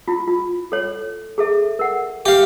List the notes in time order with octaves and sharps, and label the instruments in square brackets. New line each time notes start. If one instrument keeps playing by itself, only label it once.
[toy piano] E4 F4
F4
A4 C#5
G#4 A4 E5
A#4 F#5
[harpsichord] G4 F5 [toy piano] E5 G5